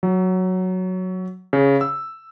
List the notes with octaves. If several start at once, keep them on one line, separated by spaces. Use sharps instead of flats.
F#3
C#3
E6